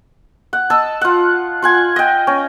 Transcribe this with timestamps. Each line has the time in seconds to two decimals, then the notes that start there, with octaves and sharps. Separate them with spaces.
0.53 F#5
0.70 D#5 A5 E6
1.01 F4 F#5
1.62 F4 F#5 G#5
1.96 D#5 G5
2.27 C#4